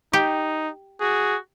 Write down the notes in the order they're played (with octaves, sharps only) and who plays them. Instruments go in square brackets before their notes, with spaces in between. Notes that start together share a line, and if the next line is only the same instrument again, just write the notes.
[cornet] D#4 [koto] G4
[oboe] F#4 [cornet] G#4